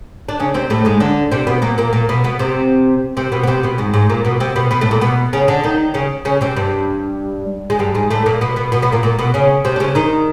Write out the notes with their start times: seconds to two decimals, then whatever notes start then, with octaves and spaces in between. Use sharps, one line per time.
0.29 D4
0.40 C#3 C#4
0.54 C3 C4
0.70 A2 A3
0.85 G#2 G#3
1.00 D3 D4
1.31 C3 C4
1.47 B2 B3
1.62 A#2 A#3
1.78 A#2 A#3
1.93 A#2 A#3
2.09 B2 B3
2.24 B2 B3
2.39 C3 C4
3.17 C3 C4
3.32 B2 B3
3.43 B3
3.47 C3 C4
3.63 B2 B3
3.78 G#2 G#3
3.94 G#2 G#3
4.10 A#2 A#3
4.25 B2 B3
4.40 C3 C4
4.56 B2 B3
4.71 B2 B3
4.81 A2 A3
4.91 A#2 A#3
5.01 B2 B3
5.33 C#3 C#4
5.48 D3 D4
5.63 D#3 D#4
5.94 C#3 C#4
6.25 C#3 C#4
6.41 C3 C4
6.56 G2 G3
7.70 G#3
7.79 G2 G3
7.94 G#2 G#3
8.10 A2 A3
8.26 A#2 A#3
8.41 B2 B3
8.56 B2 B3
8.72 B2 B3
8.82 B2 B3
8.92 A#2 A#3
9.03 A#2 A#3
9.19 B2 B3
9.34 C#3 C#4
9.65 C3 C4
9.76 D4
9.80 C#3 C#4
9.95 D#3 D#4